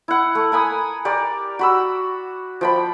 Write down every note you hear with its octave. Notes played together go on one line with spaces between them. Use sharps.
E4 F#5
A3
A#4 G#5 B5 D#6
G4 A#4 D5
F#4 B5 E6
F3 G5 B5